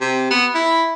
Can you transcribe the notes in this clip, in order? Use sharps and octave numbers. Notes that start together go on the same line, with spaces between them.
C3
B3
E4